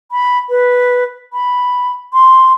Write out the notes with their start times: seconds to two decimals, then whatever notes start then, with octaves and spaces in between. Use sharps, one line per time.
0.12 B5
0.50 B4
1.33 B5
2.13 C6